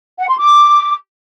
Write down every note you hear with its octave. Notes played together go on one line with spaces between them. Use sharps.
F#5
C6
D6